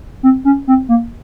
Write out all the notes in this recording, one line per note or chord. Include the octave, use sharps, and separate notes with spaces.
C4
C#4
C4
A#3